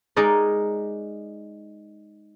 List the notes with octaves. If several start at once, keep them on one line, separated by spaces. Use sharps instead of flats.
G#3 D#4 A#4 D5